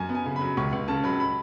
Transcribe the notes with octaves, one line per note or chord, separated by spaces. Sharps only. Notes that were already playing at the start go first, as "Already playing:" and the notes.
Already playing: F#2 G#5
B3
G#5
C#3
B5
F#3
C#2 C#6
C#2
C#3 A5
F#3 B5
B5